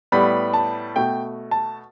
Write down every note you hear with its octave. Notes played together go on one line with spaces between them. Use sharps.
A2 G3 B3 B5
A5
B2 A3 G5
A5